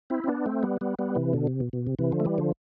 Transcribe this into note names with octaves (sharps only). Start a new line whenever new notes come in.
C4 E4
C4
B3 D4
A3 C4
G3 B3
G3 B3
G3 B3
C3 E3
B2 D3
C3
B2
B2
C3
C3 E3
D3 F3
A3
E3 G3
D3 F3